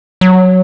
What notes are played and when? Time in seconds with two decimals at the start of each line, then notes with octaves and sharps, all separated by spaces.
0.21 F#3